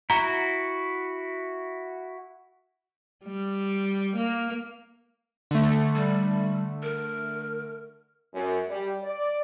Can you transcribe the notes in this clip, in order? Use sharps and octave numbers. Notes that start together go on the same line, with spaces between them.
E4 F#4 A#5
G3
A#3
D3 A3
G3
A#4
F#2
G3
D5